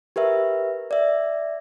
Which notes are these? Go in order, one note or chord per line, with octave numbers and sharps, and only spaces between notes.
G4 A#4 B4 E5
D5 E5